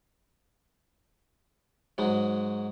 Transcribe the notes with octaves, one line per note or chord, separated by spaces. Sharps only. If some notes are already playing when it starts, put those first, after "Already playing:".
G#2 F#3 G#3